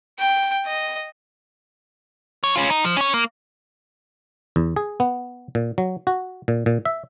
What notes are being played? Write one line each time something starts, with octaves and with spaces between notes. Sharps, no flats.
G5
D#5
F#2 C#5
C#4 F4
D#4
F3
C#4 C#5
A#3
E2
G#4
B3
A#2
F#3
F#4
A#2
A#2
E5